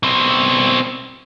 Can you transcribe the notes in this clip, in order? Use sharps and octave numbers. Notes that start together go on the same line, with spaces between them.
B2 C4